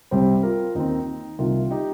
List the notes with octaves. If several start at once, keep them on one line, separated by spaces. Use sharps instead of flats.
C2 C3 G3 C4 G4 C5
F4 A#4
D#2 D#3 C4 D#4
C2 C3 D#3 A#3 F4
D#4 G4